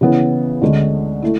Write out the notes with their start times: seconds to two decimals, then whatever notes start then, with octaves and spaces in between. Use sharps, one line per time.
0.01 C#3 E3 B3 E4
0.62 D2 D3 G#3 C#4
1.22 A3 E4